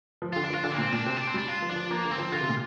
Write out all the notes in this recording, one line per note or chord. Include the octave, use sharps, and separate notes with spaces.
F3
D3 F4
D4
F3
F4
D3 D4
A#3
A#2 C4
A#2 D4
C3 C4
D4
C4
G3
D4
F4
F3
D4
F3
F3 A#3
D3
C4
F3
D3 F4
C3
A#2